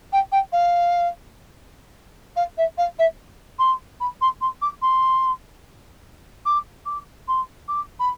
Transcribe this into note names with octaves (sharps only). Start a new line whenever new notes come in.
G5
G5
F5
F5
E5
F5
E5
C6
B5
C6
C6
D6
C6
D6
D6
C6
D6
B5